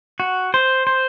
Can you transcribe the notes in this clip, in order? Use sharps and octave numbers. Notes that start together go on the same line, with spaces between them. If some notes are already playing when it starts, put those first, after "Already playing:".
F#4
C5
C5